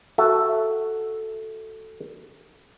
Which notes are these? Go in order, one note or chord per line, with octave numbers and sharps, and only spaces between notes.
F#4 A4 E5